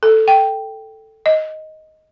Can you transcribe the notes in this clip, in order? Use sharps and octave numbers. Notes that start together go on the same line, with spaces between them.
A4
G5
D#5